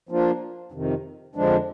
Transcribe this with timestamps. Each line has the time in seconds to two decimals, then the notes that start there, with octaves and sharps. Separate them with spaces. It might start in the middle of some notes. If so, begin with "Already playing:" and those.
0.09 F3 A#3 D4 F4
0.72 F2 C3 D#3
1.35 F2 D3 F3 G#3 D4